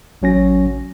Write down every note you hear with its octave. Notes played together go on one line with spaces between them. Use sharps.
A1 F#3 C#4 A#6